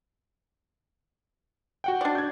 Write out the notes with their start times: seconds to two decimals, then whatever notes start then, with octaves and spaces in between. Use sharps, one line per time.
1.84 F#4 F#5 G5
2.01 D4 D5
2.15 G6 G#6